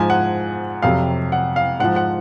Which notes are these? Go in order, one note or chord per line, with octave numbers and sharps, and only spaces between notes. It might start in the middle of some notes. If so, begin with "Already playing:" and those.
Already playing: G#2 F3 G#5
F#5
F2 C3 F#3 F5
F#5
F5
G#2 F3 F#5
F#5